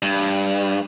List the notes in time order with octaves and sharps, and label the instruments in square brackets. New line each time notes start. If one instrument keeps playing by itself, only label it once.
[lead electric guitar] G2